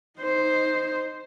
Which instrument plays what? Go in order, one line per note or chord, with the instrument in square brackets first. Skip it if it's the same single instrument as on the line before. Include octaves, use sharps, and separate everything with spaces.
[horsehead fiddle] D#4 C5